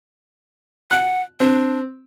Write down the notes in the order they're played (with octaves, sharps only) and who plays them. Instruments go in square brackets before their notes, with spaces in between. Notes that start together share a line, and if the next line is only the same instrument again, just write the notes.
[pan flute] F#5 [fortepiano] F#6
[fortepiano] C4 [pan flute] D4